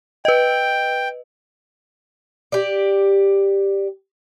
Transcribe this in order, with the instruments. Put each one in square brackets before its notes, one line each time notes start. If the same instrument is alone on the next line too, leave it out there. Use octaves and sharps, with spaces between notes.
[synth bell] B4 D#5 [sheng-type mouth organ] G5
[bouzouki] G4 D5